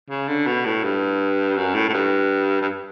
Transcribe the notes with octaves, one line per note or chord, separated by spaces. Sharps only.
C#3
D3
B2
A2
G2
F#2
A2
A2
G2
G2